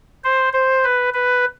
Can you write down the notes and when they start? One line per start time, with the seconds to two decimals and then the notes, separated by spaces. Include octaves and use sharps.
0.24 C5
0.53 C5
0.84 B4
1.14 B4